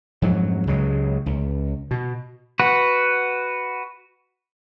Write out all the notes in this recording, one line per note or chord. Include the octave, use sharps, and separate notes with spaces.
F2 G#2 F#3
C#2 C#3 F#3 G#3
C#2
B2
F#4 B4 F#5